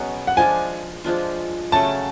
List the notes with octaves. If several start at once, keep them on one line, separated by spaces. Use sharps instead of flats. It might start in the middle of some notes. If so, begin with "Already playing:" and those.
Already playing: B2 F#3 C#4 G#4
F#5
F3 G#3 D4 F4 G#5
F3 G#3 D4 F4
C#3 F#3 A3 C#4 A5